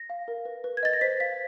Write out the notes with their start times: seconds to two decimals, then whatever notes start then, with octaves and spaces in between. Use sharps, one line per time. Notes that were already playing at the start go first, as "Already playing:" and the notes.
Already playing: A#6
0.10 F5
0.28 A#4
0.45 B4
0.64 B4
0.77 G#6
0.83 D#5 A6
0.93 A#6
1.01 C5 B6
1.20 F5 B6